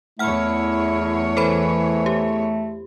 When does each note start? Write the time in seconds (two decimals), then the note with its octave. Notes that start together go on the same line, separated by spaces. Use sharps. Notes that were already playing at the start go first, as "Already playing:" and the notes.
0.19 E2 A3 E4 C#5 F#5 F6
1.37 E3 A4 C5 B5
2.06 G4